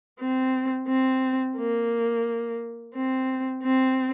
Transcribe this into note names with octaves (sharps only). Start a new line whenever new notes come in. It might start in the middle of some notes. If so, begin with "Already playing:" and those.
C4
C4
A#3
C4
C4